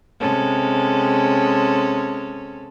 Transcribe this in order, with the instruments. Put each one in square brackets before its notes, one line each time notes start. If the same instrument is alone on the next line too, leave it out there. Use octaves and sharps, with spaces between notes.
[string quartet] C3 G#3 C#4 A4